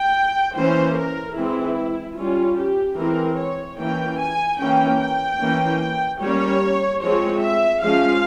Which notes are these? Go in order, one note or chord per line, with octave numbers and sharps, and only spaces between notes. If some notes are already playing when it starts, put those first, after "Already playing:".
Already playing: G5
E3 A#3 C#4 C5
A#4
E3 G#3 C4 E4
G3 C#4 F4
G4
E3 G#3 C4 A#4
C#5
E3 A#3 C#4 G5
G#5
E3 A#3 C#4 G5
G5
E3 A#3 C#4
G3 A#3 C#4 C#5
F3 G#3 C4 C#5
E5
F3 G#3 C#4 F5